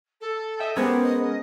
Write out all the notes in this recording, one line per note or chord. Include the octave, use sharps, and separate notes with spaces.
A4
D#5 E5 G5
G#3 B3 C#4 G4 A#4 C5 G#5
D#5